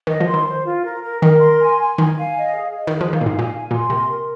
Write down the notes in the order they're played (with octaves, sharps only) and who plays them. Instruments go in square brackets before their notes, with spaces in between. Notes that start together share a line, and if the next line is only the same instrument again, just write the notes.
[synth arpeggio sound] D#3 [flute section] D#5
[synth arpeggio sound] F3
[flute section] C6
[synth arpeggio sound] D#3
[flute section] C5
F4
A#4
A#4
[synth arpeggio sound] D#3 [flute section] A#4
[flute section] C6
G#5
G#5
[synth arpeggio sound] D#3 [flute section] G#5
[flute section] F5
D#5
G#4
D#5
[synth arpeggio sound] D#3
[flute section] G#4
[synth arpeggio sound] F3
[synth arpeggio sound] D#3 [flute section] F5
[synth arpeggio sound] A#2
G#2
[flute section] G#5
[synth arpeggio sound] A#2
[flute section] G#5
[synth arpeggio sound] A#2 [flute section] C6
[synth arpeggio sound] C3 [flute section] A#4
[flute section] A#4